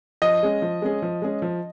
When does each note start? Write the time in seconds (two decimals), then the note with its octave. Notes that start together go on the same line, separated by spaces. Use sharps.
0.22 F3 D#5
0.43 G#3 C#4 G#4
0.62 F3
0.82 G#3 C#4 G#4
1.02 F3
1.22 G#3 C#4 G#4
1.42 F3